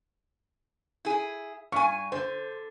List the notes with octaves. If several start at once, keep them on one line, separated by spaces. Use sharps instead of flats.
E4 G#4
G2 G#5 C#6
D3 C5